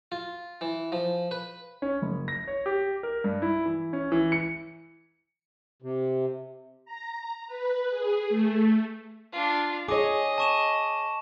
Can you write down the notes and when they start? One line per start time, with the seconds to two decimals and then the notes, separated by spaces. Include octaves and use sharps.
0.12 F4
0.61 E3
0.92 F3
1.31 B4
1.82 C#4
2.02 F#1
2.28 A#6
2.48 C#5
2.66 G4
3.03 A#4
3.24 G2
3.42 E4
3.66 E3
3.93 C#4
4.12 E3
4.32 C#7
5.82 C3
6.85 A#5
7.47 B4
7.90 G#4
8.29 A3
9.32 D4 F4
9.88 G#4 C#5 D#5 D6
10.38 A5 C#6 E7